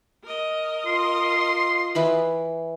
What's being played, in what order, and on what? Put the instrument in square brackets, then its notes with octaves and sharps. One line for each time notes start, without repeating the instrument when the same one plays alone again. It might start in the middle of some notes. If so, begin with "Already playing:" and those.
[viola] A#4 D#5
[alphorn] F4 [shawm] C6
[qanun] E3 B4 B5